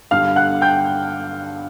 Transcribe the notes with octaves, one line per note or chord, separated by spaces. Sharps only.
G2 D3 G3 F5 F6
F#5 F#6
G5 G6